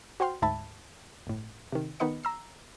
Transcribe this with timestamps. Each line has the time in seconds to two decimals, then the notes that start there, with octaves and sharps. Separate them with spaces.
0.20 F#4 C5 G5 C6 F6
0.42 D2 G#2 E5 A5 B5 G#6
1.27 G1 A2
1.72 C3 D#3
2.00 D#3 B3 D#4 B4 D#5 C#7
2.24 A#5 E6 C7